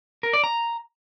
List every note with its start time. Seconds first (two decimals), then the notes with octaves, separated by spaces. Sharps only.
0.23 A#4
0.33 D5
0.44 A#5